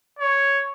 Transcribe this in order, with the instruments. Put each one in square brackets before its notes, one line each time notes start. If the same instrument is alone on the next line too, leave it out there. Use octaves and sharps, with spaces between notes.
[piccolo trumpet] C#5